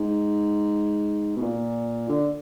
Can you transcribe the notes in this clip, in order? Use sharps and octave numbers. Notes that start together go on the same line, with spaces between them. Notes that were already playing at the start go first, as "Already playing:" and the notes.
Already playing: G#2
B2
A#2
D3